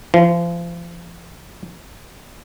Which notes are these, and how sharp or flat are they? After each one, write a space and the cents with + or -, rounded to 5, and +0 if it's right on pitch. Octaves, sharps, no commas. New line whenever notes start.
F3 -35